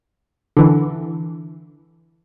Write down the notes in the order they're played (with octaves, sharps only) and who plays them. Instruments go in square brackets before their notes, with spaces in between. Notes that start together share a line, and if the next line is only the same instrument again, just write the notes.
[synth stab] D3 E3